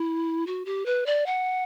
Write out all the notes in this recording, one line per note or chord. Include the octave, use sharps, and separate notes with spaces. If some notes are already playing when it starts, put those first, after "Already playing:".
Already playing: E4
F#4
G4
B4
D5
F#5